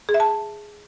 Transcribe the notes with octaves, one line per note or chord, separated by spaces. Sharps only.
G#4
E5
A5